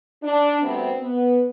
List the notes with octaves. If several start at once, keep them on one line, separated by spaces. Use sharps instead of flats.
D4
D2 C3 G3 B3 C4
B3